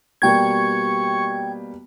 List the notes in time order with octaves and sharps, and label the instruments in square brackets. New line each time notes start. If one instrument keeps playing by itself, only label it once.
[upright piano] B2 G3 A#3 [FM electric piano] G5 G#6 [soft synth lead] C#6